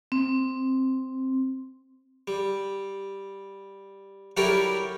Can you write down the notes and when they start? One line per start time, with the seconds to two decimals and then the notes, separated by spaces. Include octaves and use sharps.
0.12 C4
2.28 G3
4.37 F#3 G3 E4 G4 A4 A#4